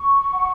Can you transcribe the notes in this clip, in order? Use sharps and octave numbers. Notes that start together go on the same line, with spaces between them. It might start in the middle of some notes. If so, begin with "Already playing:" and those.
Already playing: C#6
F#5